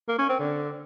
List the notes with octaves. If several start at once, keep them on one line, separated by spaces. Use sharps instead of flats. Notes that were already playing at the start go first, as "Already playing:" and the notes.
A#3
C#4
C4
D3